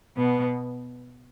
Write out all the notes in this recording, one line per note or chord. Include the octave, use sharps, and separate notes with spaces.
B2 B3